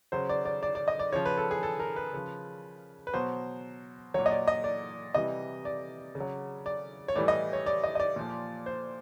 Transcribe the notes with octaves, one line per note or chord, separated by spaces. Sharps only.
C#3 F#3 C5
D5
D5
D5
D5
D#5
D5
C#3 F3 C#5
B4
A4
G#4
A4
A#4
B4
C#3 F3
B4
B2 F#3 C5
A#2 F#3 C#5
D#5
D5
D#5
D5
C3 E3 G3 D#5
D5
C#3
F#3
D5
C#5
A2 E3 G3 D5
D#5
C#5
D5
D#5
D#5
D5
A#2 F3
C5